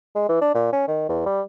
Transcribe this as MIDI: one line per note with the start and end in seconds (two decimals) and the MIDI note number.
0.16 0.25 56
0.29 0.37 52
0.42 0.54 62
0.55 0.69 46
0.73 0.85 61
0.88 1.04 51
1.09 1.25 40
1.26 1.42 55